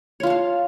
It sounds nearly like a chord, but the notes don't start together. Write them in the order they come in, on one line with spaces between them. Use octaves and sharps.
C#5 F4 A5 F5